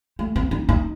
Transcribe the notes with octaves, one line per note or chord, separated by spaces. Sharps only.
A3
C4
D#4
D#4